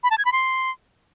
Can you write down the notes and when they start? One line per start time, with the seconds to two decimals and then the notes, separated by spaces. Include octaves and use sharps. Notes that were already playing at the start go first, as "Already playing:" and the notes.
0.03 B5
0.11 A5
0.18 G#6
0.25 B5
0.32 C6